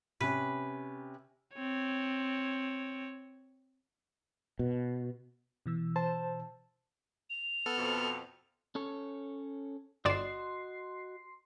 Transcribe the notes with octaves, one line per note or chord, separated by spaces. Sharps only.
C3 C#4 B4
C4 C#5
B2
B2 E3 E6
C5 A5
F7
B3 A4 F6
F2 B2
C#4 A4 C#5
G1 F#4 D5 D#5 C6 C7 E7